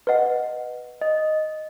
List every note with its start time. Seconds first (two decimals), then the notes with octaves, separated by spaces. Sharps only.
0.07 B4 D#5 F#5
1.01 D#5